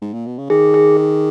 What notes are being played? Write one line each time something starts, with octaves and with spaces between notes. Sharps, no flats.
G#2
A#2
B2
C#3
D#3 G#4
G#4
G#4